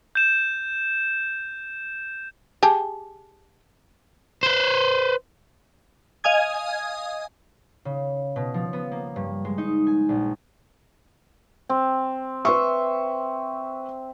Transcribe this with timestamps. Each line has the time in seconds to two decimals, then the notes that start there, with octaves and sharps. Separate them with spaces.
0.15 G6 E7
2.63 G4 G#4 A5
4.43 B4 C5
6.24 D#5 F5 G#5 D#6 G#6
7.85 C#3
8.36 B2
8.54 F3
8.73 B3
8.92 A#3
9.16 G2
9.45 G#3
9.58 D#4
9.87 G#5
10.09 A#1
11.69 C4
12.45 B4 E5 C6 C#6